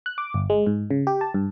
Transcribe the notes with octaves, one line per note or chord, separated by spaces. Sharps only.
F#6
D6
G1
G#3
G#2
C#3
G4
A5
G2